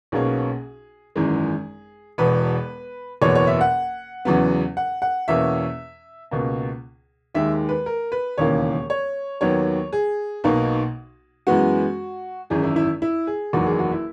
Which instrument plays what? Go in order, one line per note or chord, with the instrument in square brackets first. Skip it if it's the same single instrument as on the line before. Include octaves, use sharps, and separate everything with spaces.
[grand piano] B1 B2 A#3 C#4 G#4
G#1 F#2 E3 G#3 G#4
E1 E2 B2 B4
F#1 E2 B2 C#5
C#5
E5
F#5
E2 C#3 F#3 B3
F#5
F#5
E2 B2 A#3 C#4 E5
C#2 B2 A#3
D#2 D#3 G#3 E5
B4
A#4
B4
E1 D#2 C#3 E3 A#3 C#5
C#5
D#2 D#3 F#3 B3 C#5
G#4
B1 B2 A#3 D#4
F#2 E3 G#3 B3 F#4
G#1 F#2 E3 G#4
E4
E4
E4
G#4
F#1 E2 D#3 F#3 F#4
G#4
F#4
E4